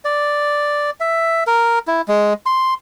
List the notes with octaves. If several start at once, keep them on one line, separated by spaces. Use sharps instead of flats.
D5
E5
A#4
E4
G#3
C6